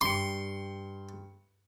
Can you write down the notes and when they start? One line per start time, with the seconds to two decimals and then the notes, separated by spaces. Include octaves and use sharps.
0.01 G2 G5 C6 C#7